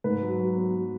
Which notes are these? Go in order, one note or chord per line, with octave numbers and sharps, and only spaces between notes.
G#2 B4
F#3
F#3
B3
F#3